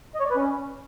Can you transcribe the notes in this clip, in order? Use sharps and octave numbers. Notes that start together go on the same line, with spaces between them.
D#5
C#5
D5
B4
C#4